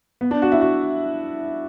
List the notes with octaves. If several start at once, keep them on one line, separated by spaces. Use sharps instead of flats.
B3
D4
F#4
E4
F#4